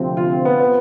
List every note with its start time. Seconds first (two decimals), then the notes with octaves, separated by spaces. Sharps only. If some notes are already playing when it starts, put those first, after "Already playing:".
Already playing: D2 C3 F3 C4
0.17 F4
0.45 B3
0.60 B3